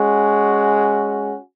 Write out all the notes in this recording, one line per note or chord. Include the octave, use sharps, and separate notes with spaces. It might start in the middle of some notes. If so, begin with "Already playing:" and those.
Already playing: G#3 C#4 F#4